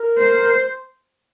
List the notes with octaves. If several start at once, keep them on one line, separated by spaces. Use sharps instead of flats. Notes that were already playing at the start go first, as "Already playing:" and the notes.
Already playing: A#4
C5
C5